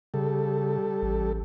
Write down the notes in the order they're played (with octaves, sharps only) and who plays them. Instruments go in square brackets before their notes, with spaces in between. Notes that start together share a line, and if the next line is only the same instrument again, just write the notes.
[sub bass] C#3 [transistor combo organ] G3 A4
[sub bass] A1